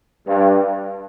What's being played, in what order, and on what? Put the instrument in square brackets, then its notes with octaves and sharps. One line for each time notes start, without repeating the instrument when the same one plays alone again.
[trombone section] G2